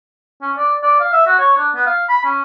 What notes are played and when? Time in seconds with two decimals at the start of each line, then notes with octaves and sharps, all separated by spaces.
0.42 C#4
0.57 D5
0.83 D5
1.00 F5
1.13 E5
1.27 F#4
1.39 C#5
1.58 D4
1.75 B3
1.87 F5
2.09 B5
2.25 C#4